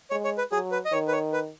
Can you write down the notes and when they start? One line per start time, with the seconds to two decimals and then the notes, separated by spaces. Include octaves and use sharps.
0.10 G#3 C#5
0.24 C#5
0.38 B4
0.52 F#3 G#4
0.72 B4
0.85 D#5
0.92 D#3 C#5
1.08 B4
1.12 C#5
1.33 B4